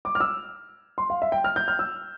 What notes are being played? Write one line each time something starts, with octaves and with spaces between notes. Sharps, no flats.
D6
F6
E6
C6
F5
E5
G5
F6
G6
F6
E6